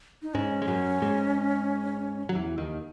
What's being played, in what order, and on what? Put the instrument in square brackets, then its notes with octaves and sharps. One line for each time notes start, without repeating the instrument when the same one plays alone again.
[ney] D#4
[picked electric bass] G#2 G#3 [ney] C#4
[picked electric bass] G#3
F#2 F#3
G#2 G#3
F#3
E2 E3
D#2 D#3